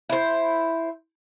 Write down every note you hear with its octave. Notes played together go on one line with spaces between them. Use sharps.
E4 C5